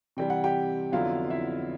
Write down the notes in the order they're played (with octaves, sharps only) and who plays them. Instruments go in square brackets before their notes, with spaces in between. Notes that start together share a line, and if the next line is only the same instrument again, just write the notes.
[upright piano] C3 E3 G3 G5
F#5
G4 G5
F2 D3 F#3 B3 E4 F4 F5
E4 E5